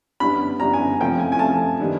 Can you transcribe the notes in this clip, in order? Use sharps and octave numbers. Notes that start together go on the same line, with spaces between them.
F#2 D3 G3 B3 D4 B5
F#2 D3 G3 B3 D4 A#5
G#5
C3 F3 A3 G5
G#5
G#5
C3 F3 A3 A5
D#3 G3 B3 D4